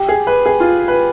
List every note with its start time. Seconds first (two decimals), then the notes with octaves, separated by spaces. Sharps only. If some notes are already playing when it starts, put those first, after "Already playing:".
Already playing: G4
0.08 G#4
0.27 B4
0.46 G#4
0.60 F4
0.88 B4